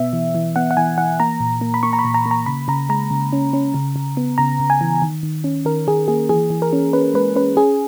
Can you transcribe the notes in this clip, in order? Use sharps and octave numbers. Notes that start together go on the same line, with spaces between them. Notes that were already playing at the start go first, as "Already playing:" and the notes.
Already playing: B2 B3 E5
E3
E3
B3 F#5
F#5
E3 G#5
E3 F#5
A#3 A#5
A#2
A#3
B5
A#3 C#6
A#5
B5
A#2
A#5
A#3
A#5
C#3 B5
C#3 A#5
G#3 A#5
C#3
C#4
C#4
C#3
C#3
B3
C#3 A#5
C#3
G#5
E3
D#3
D#3
C#4
D#3 A#4
D#3 G#4
A#3 G#4
E3 G#4
E3
A#4
C#4
C#4 B4
G#3 B4
C#4 B4
C#4 G#4